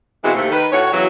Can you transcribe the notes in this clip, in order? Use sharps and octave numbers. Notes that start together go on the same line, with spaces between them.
B2 E3 G#3 A#3 C4 F#4
D#2 C3 A3
D#3 B4
A2 C#4 F#4 C#5
E2 C#3 E3 F#3